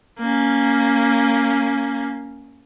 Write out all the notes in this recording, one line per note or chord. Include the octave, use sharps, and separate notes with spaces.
A#3 C#4